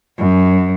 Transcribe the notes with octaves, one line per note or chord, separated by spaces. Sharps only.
F#2